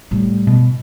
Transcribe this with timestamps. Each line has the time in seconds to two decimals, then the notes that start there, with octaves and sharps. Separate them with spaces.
0.11 A2 G3
0.47 B2